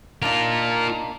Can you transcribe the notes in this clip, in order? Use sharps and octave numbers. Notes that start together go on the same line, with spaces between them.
A#3 D4 D#4 F4 A#4